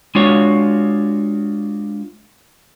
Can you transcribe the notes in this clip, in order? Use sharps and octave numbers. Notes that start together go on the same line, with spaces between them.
G#3 D4 F4 F#4 C#5